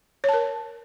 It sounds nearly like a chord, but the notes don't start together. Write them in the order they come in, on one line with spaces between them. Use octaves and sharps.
C#5 A5 A#4